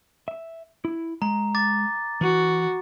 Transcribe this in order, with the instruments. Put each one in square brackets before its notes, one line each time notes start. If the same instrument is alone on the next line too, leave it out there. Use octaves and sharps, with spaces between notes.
[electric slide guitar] E5
E4
[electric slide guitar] G#3 [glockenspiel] A#5
[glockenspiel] D6 A6
[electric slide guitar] E3 [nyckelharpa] F#4